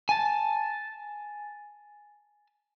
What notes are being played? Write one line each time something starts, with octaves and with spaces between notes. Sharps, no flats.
G#5 A5